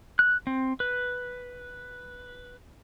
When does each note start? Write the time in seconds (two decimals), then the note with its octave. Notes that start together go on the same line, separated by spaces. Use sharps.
0.19 F#6
0.47 C4
0.80 B4